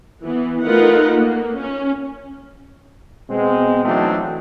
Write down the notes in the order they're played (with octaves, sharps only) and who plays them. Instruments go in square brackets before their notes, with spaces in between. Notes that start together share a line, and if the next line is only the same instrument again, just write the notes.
[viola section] E3 B3
A3 D#4 F4 A#4 B4 F#5
A#3
C#4
[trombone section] B2 G#3 C4
E3 F#3 A3 C4 D4 D#4